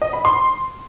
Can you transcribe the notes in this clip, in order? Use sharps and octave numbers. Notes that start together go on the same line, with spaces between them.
D#5
B5
C6